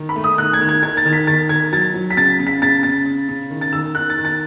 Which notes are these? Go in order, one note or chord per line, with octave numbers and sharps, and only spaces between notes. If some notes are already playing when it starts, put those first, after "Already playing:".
Already playing: D#3
B5
A3
D#6
D#3 F#6
G#6
D#3
G#6
D#3 G#6
A6
D#3
B6
D#3 A6
D#3 G#6
F#3 A6
F#3
B6
C#3 A6
C#3
B6
C#3 A6
C#3 A6
C#3
C#3
D#3
A6
D#3 E6
D#3 F#6
A6
D#3
A6